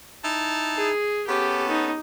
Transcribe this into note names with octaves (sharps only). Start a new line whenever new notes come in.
D#4 E4 A5
G#4
B3 C#4 G4 A4
D#4